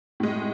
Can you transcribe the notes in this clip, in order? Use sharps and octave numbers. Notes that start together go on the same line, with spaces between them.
A2 G#3